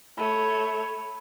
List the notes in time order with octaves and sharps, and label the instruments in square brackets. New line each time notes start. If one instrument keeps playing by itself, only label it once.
[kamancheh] A3 C#5 [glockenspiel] B5 D#7